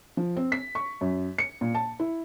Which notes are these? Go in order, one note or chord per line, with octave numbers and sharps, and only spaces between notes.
F3
C4
B6
C#6
F#2
C#7
A#2
A5
E4